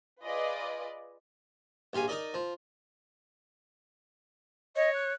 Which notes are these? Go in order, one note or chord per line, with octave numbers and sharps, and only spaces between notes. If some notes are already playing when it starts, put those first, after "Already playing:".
F4 G#4 B4 D5 D#5
A#1 G4 F5 G#5
D#4 A#4 D5 D#5
F3
C#5 D#5
F#6